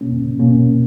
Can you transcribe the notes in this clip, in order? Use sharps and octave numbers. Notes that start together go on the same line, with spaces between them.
B2 A#3 C#4
B2 A#3 C#4